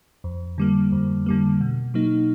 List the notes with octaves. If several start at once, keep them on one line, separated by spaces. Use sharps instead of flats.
F2
D3 G3 A#3
F2
D3 G3 A#3
B2
F#3 A#3 D#4